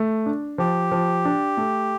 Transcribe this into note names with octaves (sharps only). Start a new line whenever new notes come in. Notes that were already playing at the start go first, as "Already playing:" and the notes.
Already playing: A3
D4
F3 G4
F3
D4
A3